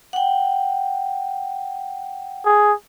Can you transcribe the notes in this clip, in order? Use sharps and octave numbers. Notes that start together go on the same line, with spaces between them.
F#5 G5
G#4